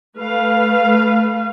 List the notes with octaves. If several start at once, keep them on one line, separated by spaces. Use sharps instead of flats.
A3 B4 F5